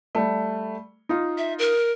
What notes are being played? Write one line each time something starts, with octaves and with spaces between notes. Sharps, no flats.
G3 A3
D#4 F4
E5
A#4